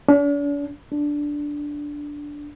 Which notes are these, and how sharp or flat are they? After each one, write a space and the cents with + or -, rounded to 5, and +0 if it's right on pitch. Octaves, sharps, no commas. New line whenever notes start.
D4 -45
D4 -5